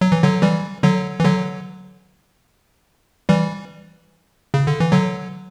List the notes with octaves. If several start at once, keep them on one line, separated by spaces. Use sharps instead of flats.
F#3
E3
D3 F#3
E3 G3
D3 F#3
E3
D3 F#3
E3 G3
C#3
D3
E3
D3 F#3